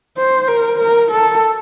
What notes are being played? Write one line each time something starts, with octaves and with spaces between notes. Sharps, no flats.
C5
A#4
A#4
A4